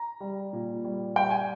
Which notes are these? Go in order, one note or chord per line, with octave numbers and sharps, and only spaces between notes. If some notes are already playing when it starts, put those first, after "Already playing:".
Already playing: A#5
G3
A#2
G3
G3 G5
G#5